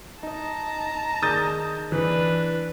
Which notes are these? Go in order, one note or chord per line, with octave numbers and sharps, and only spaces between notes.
D#4 D#5 A5 A#5
D#3 G#4 D5 D#6 G6 A6
E3 D4 B4